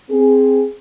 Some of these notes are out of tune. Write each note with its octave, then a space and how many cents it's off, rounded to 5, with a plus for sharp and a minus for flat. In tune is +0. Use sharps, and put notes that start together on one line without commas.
C4 +0 G#4 +0